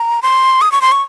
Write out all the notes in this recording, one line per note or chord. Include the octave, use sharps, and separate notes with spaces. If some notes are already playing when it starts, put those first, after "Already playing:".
Already playing: A#5
C6
D#6
C#6
C6
C#6